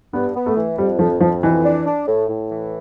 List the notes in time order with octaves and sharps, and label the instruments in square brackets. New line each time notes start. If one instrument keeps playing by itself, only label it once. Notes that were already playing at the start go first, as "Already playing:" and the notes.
[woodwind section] G2 [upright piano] B3
[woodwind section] B3
[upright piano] A3
[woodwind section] E3
[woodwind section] F2 [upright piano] G3
[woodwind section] F2 [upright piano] F3
[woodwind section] F2 [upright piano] F3
[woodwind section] B2 [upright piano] E3
[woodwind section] D4
D4
A2
A2
E3